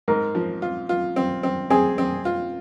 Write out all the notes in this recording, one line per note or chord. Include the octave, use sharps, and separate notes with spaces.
G#2 A#4
F3
F4
F4
C4
C4
C4 G#4
C4
F4